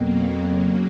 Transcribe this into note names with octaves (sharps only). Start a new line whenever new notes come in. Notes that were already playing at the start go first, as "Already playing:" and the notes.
Already playing: F2 B2 F#3 A#3
C#3 F#3 A#3